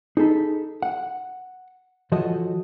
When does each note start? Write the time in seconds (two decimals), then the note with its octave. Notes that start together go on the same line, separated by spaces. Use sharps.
0.17 D#4 G#4 A4 B5
0.82 F#5
2.12 E3 F3 F#4 A4 C#5 D#5